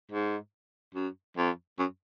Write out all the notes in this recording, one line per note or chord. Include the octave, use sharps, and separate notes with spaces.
G#2
F#2
F2
F#2